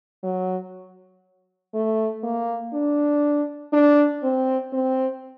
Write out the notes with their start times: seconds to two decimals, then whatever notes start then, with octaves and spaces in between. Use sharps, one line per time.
0.24 F#3
1.74 A3
2.24 A#3
2.74 D4
3.73 D4
4.23 C4
4.73 C4